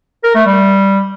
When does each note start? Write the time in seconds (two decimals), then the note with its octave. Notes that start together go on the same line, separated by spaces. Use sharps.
0.24 A#4
0.35 A3
0.46 G3